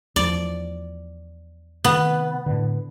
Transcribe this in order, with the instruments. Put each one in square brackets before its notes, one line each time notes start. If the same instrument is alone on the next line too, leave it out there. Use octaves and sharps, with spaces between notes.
[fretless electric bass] E2 F3 [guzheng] D5
[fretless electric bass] C3 D#3 [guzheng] B3
[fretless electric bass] A2 D3